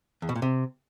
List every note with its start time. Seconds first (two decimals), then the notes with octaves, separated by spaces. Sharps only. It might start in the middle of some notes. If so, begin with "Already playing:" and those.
0.22 E2
0.29 B2
0.36 A#2
0.42 C3